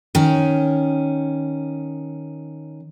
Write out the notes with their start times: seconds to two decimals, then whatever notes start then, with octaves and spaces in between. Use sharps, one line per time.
0.15 D#3 C#4